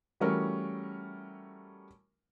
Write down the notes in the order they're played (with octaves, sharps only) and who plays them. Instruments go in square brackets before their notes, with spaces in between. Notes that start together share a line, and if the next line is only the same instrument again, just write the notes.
[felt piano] E3 G3 A3 C#4 F#4 A#4